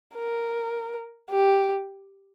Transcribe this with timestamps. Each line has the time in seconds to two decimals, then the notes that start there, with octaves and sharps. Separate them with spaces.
0.15 A#4
1.31 G4